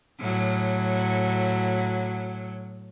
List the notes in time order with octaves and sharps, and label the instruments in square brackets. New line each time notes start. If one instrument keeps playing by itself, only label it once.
[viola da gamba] A2 F#3